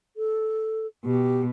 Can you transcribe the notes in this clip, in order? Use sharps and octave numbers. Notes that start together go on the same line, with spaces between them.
A4
B2 G4